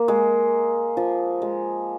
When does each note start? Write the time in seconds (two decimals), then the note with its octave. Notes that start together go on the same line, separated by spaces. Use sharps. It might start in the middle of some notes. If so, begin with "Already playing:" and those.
Already playing: A#3
0.08 G#3
0.97 F3
1.42 G#3